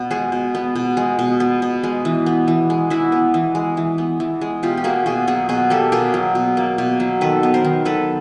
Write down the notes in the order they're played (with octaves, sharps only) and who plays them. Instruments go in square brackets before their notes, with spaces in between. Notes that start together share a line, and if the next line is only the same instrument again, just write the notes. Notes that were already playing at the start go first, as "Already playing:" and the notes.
Already playing: [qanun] B2 B3
G#3 F#4 G#4
B2
B3
B2
G#3
B2
B3
B2
G#3
E3
B3
E3
G#3
E3 E4 F#4
B3
E3
G#3
E3
B3
E3
G#3
B2 F4 G4
G4
A#3 F#4 G#4
B2 F#4 G#4
F#3 F#4 G#4
B2 F#4 G#4
A#3 G4 A4
B2 G#4 A#4
F#3
B2
A#3
B2
F#3
D#3 A4 B4
B3
A#4 C5
D#3
F#3 A4 B4